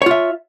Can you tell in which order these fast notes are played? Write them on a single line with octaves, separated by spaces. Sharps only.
C#5 F4 E5